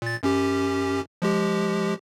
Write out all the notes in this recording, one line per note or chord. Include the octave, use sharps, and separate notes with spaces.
A#2 A6
F#2 C#4 G4
F3 G#3 G4